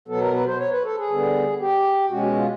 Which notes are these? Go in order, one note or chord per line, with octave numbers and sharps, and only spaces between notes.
B2 F#3 B3 A4
A#4
B4
C5
C#5
B4
A4
G#4
D3 G3 B3
G4
B2 G#3 C#4 F#4
F4